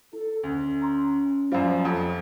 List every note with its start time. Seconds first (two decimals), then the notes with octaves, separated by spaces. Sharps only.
0.13 E4 A4
0.43 D2 C#4
0.82 A#5 C6
1.52 F#2 F3 G3 C5 F5
1.85 F2